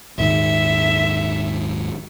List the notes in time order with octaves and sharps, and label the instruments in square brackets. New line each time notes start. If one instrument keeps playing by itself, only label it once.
[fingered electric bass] D#1 G#2 D#3 [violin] E5